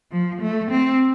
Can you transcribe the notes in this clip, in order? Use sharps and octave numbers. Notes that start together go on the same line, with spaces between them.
F3
A3
C4